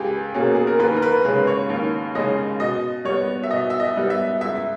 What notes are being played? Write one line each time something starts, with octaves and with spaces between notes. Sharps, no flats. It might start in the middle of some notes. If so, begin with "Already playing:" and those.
Already playing: C#2 G4 G#4
B2 A#3 C#4 G#4
G#4
A#4
D#2 B4
A#4
B4
C#3 G#3 C#4 B4
C#5
D#2
C#3 G#3 C#4 D#5
B2 D#5
G3 B3 C#5
E5
B2 D#5
E5
D#5
G3 B3
E5
C#2 E5